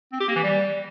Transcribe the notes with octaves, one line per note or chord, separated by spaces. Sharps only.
C4
G4
A#3
E3
G3